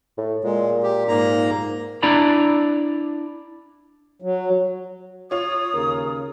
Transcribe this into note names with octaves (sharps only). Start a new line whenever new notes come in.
A2
A#2 G#3
G4
G#2 A#3 A#5
D4 E4 D5 A#5 B5
F#3
F4 C#5 D#6
D#2 C#3 A#4